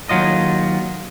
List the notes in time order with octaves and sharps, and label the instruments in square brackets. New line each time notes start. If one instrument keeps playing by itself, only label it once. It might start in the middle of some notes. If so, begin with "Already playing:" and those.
[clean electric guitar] D#2 A#2 F#3 F4 D#5